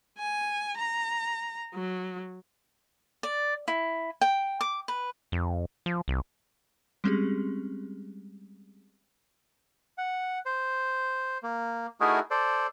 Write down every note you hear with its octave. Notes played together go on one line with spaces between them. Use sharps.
G#5
A#5
F#3
D5
E4
G5
D6
B4
F2
F3
C2
G3 G#3 C4 C#4 G4 G#4
F#5
C5
A#3
A3 D#4 E4 F#4 G#4 A#4
A4 C5 D5